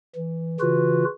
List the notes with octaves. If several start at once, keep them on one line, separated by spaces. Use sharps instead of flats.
E3
C#3 E3 F4 F#4 B4